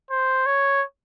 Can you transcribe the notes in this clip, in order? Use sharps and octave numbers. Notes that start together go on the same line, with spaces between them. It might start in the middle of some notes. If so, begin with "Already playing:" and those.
C5
C#5